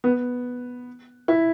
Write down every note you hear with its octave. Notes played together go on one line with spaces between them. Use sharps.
B3
E4